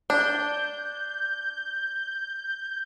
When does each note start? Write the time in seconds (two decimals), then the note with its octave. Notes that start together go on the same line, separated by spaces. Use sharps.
0.10 D4 G6